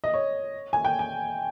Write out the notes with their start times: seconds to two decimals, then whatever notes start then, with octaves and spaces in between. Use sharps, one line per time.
0.04 D#5
0.14 C#5
0.73 G#5
0.85 G5
0.99 G#5